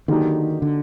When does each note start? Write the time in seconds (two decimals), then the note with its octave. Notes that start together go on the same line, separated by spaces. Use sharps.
0.08 D3 D#3 F#3 A#3 D#4 G4
0.62 D3